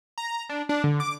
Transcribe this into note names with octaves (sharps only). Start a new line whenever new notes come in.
A#5
D4
D4
D3
D6